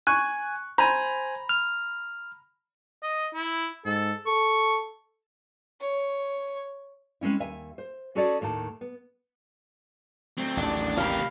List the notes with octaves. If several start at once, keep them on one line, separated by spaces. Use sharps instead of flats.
G#5 C#6 F#6
C5 G#5 A#5 B5
F6
D#5
E4
G#2 A4
A4 C#6
C#5
G#3 C4 C#4 E4
D#2 E5 G#5
C5
C#4 F#4 G#4 A4 C#5 D5
D#2 A2 D#3 A5
B3
F#3 A3 C4
A1 D#2 D4
C3 A#3 G4 A#4 F5 B5